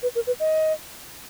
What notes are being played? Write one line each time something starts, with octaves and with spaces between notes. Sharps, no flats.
B4
A#4
B4
D#5